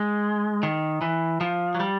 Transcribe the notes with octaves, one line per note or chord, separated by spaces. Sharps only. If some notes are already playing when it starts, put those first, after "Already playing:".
Already playing: G#3
D#3
E3
F3
F#3
G3